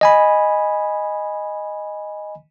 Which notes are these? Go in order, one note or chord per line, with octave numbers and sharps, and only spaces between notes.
D#5 G#5 B5